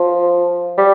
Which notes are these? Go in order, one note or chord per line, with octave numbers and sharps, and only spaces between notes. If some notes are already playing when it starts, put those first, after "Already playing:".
Already playing: F3
G3